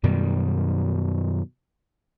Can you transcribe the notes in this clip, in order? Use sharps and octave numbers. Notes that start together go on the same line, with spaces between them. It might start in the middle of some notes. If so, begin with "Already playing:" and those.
F#2 B2 D#3 G3